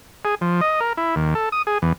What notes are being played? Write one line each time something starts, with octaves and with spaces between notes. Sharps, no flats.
G#4
F3
D#5
A#4
E4
D#2
A4
D#6
G#4
E2